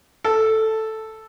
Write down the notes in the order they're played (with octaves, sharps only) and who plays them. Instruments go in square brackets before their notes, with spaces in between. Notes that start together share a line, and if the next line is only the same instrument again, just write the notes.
[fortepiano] A4